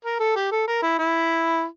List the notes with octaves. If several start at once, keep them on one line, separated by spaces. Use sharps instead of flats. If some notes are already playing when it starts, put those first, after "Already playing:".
A#4
A4
G4
A4
A#4
E4
E4